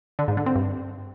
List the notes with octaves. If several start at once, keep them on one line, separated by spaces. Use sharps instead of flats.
D3
G#2
D3
C4
G2